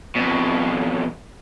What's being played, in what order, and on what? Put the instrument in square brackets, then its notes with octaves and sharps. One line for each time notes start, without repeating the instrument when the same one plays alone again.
[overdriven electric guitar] F2 B2